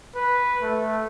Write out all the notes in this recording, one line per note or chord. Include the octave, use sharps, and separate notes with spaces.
B4
A3